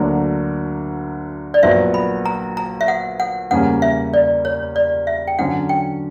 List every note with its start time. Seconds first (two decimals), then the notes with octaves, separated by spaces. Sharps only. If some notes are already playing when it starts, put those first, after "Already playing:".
Already playing: D2 D3 F#3 A#3 D4
1.54 D5
1.63 A#1 A#2 F#3 B3 F#4 E5
1.94 B5
2.26 A#5
2.57 A#5
2.81 E5
2.88 F#5
3.20 F#5
3.51 E2 C#3 G3 A#3 C#4 F#5
3.82 E5
4.13 D5
4.45 C#5
4.76 D5
5.07 E5
5.28 G5
5.39 D3 F#3 C#4 F#5
5.69 G5